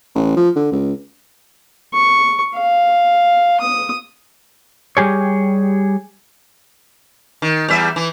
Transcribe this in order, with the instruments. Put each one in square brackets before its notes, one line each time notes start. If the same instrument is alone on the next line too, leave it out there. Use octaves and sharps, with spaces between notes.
[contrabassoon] A1
F3
D3
C#2
[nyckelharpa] C#6
F5
D#6
[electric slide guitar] G3 G4 G#4 C#5
[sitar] D#3
E2 G3 E5
E3